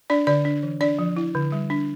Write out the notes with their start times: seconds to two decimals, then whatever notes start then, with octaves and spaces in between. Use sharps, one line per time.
0.10 D4 D5
0.27 D3 D5
0.45 D4
0.63 E3
0.81 D4 D5
0.99 F3
1.17 E4
1.35 D3
1.52 G3
1.70 D4